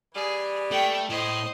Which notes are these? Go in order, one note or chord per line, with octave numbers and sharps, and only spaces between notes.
E3 G3 G#4
A3 G5
A2 C5 D#5